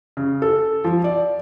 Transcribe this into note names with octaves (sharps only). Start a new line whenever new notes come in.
C#3
A4
F3
D5